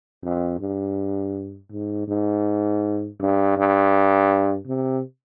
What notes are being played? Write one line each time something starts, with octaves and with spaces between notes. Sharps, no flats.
F2
G2
G#2
G#2
G2
G2
C3